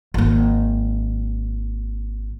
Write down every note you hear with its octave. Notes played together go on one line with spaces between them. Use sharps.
G#1 A#3